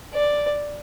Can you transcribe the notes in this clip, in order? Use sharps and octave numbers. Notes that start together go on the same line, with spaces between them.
D5